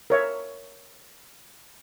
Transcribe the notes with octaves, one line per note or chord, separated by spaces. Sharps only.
A#4 C#5 E5